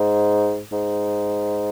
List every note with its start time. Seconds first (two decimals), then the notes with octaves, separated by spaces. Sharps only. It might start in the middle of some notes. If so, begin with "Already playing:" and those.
Already playing: G#2
0.72 G#2